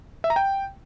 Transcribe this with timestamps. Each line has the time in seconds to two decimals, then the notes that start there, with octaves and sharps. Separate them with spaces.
0.24 E5
0.30 A#5
0.36 G5